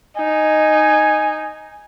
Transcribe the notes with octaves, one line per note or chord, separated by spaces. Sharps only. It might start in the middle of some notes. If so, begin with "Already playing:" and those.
D#4 G#5